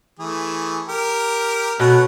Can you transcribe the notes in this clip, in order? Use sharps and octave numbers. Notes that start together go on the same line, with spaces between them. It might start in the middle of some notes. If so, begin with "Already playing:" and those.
E3 A3 G#4
G4 A#4
B2 A3 C#4 F#5